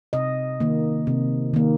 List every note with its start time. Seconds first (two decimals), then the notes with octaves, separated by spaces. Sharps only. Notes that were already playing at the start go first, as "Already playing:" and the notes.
0.13 C3 D#5
0.60 D#3 A#3
1.07 C3
1.54 D#3 A#3